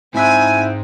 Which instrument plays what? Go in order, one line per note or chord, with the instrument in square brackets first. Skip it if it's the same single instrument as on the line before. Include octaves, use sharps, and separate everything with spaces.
[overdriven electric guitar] G#2 [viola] C4 [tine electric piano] E4 E5 F#6 [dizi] G#5